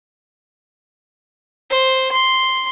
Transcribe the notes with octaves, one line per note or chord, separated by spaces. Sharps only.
C5
C6